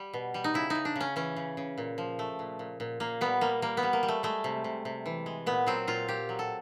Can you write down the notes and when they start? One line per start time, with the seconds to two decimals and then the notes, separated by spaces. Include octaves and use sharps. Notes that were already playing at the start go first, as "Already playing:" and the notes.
Already playing: G3
0.13 B2
0.34 G3
0.44 D#4
0.54 C#3 E4
0.70 C#3 D#4
0.85 D4
0.96 C#3 C#4
1.16 E3 C#4
1.36 C#3
1.57 C#3
1.78 A#2
1.98 F3
2.19 A3
2.39 A#2
2.59 A#2
2.80 A#2
3.00 A#2 A#3
3.21 G3 B3
3.41 G3 A#3
3.62 G3 A#3
3.77 B3
3.83 G3
3.93 A#3
4.03 G3
4.08 A3
4.23 G#3 A3
4.44 C3
4.64 C3
4.85 C3
5.06 E3
5.26 G#3
5.46 A#2 B3
5.67 F#3 C4
5.87 A#2 F4
6.08 A#2 G4
6.29 F#3
6.39 A4